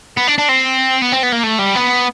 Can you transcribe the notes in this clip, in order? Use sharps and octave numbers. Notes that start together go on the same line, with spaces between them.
B3
D4
D4
C4
B3
C4
B3
A#3
A3
G3
B3